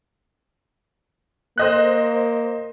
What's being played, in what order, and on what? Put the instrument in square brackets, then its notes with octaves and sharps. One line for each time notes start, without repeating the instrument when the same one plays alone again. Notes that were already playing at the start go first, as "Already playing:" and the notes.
[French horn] A#3 [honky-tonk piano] C5 D#5 F#6